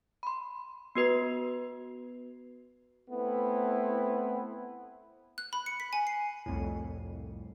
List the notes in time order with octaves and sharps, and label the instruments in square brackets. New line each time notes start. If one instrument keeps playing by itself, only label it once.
[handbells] B5 C6
B3 F#4 B4 C7
[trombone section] A3 B3 C4 E4
[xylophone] F#6
B5
C#7
B6
G#5
C7
[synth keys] C2 F2 A2